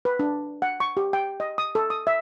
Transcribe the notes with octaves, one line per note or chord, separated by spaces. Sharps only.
B4
D4
F#5
C#6
G4
G5
D#5
D#6
A4
D#6
E5